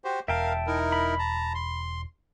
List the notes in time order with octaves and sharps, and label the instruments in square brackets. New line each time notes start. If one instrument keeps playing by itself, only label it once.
[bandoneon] F#4 G4 C5
[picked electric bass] E1 [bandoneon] A#4 F5 [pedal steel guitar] E5 G5 A5
[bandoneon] D#4 E4 A#4
[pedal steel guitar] B5
[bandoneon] A5 A#5
C6